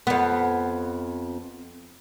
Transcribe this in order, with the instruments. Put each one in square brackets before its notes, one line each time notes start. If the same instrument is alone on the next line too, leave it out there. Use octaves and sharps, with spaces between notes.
[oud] F2 B3